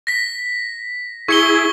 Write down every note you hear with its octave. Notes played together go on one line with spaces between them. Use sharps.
A#6 B6
E4 G#4 C#6 C#7 G7